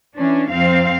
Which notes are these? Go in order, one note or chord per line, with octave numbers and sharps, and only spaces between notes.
E3 C#4 D4
F2 C4 F5